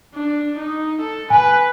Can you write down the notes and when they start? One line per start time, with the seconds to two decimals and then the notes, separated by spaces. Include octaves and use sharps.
0.14 D4
0.58 D#4
1.01 A4
1.30 B4 G#5